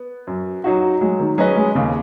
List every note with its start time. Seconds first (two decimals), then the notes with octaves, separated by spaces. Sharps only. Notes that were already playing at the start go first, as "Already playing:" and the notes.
Already playing: B3
0.27 F#2
0.64 F#3 D#4 F#4
1.01 F#3 G#3
1.20 D#3
1.38 F#3 C#4 G#4 B4 D#5
1.56 G#3
1.75 D#2 C#3